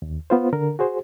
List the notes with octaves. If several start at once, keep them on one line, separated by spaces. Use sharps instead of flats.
D#2
B3 F4 C5
D3 A#4
F#4 G#4 C5